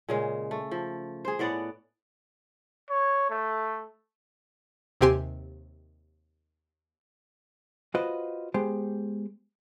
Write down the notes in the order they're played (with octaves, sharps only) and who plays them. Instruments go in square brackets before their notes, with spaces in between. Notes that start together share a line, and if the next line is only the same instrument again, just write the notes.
[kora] A#2 C#3 G#3
A3
F3
G#4 C5
A2 B3 D5 F#5
[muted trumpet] C#5
A3
[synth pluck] D#2 C3 C4 G4 G#5 C6
[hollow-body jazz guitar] F4 F#4 B4 C5 D#5
G#3 B3 G4 C5